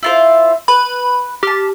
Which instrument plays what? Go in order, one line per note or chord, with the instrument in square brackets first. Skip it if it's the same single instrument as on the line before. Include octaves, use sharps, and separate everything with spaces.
[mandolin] E4 F4 C5
[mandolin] B4 [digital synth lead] B5
[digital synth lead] G4 [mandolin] A5 F6